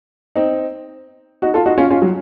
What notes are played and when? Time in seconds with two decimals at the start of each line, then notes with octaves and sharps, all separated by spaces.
0.36 C4 D#4
1.42 D#4 F#4
1.54 F4 A4
1.66 D#4 F#4
1.78 C#4 F4
1.90 C#4 F4
2.02 F#3